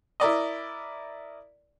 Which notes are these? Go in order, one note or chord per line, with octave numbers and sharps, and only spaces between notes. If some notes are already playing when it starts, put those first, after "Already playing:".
E4 A#4 D5 D#5